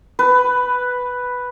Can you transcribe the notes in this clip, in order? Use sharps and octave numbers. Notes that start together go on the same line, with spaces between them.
B4